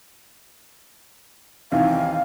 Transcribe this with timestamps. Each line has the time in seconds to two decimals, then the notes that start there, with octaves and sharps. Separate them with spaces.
1.72 D#2 C3 E3 F5